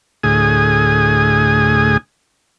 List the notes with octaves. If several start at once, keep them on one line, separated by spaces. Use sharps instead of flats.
D2 A2 G#4 G#5 D#6